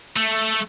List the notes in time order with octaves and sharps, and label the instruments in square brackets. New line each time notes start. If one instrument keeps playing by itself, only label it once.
[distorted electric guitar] A3